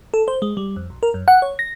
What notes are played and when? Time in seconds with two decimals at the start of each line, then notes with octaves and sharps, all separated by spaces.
0.14 A4
0.28 C5
0.42 G#3
0.57 G3
0.76 F2
0.90 B1
1.03 A#4
1.14 F#2
1.28 F#5
1.42 C#5
1.59 A#6